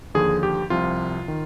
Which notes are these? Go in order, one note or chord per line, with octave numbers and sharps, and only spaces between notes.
D#2 D3 F3 G#4
G4
C2 C3 F3 F4
D#3